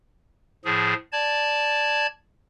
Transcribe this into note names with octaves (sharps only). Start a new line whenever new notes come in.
A2 F3 G#4
D5 A5 G#6